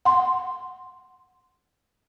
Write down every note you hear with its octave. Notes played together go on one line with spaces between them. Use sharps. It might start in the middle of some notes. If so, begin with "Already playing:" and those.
F#5 C6